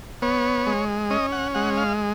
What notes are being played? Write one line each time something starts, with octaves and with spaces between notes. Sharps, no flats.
B3 C#5
G#3
C#4 D#5
F#5
G#3 F#5
F5